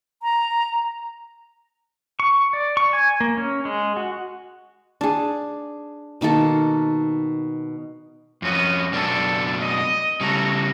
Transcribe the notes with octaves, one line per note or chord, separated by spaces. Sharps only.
A#5
C#6
D5
C#6
G#5
A#3
C#4
G#3
F#4
D4 G#4
B2 D#3 A#3 A4
F2 B3 C#4 F#4 D#5
F#2 B2 D4 A4
D#5
C#3 G3 F#4 A4 A#5